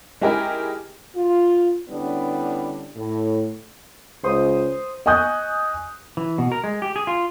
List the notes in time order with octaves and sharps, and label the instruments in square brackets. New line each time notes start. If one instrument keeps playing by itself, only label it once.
[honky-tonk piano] G#3 D#4 E4 G4 G#4 A#4
[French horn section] F4
D3 G3 B3 C#4 D4 E4
A2
[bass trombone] C#2 [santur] C5 D#6
[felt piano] D#5 G#5 C#6 D#6 F#6 G6
[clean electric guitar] E3
B2
A#4
G#3
G4
G#4
F4